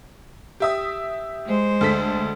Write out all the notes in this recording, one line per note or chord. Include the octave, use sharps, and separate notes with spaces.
G4 E5 D#6
G#3 C5
D2 A4 B6